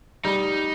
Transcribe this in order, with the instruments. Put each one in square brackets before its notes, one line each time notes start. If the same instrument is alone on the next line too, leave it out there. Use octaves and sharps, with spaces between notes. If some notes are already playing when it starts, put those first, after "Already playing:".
[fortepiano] G3 [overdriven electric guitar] D#4